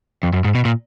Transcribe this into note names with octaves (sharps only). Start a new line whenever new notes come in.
F2
F#2
G#2
B2
A#2